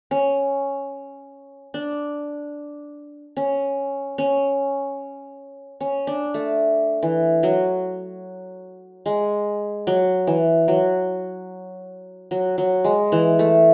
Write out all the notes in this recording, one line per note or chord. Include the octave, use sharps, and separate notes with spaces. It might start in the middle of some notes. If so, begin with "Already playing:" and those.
C#4
D4
C#4
C#4
C#4
D4
A3
E3
F#3
G#3
F#3
E3
F#3
F#3
F#3
G#3
E3
A3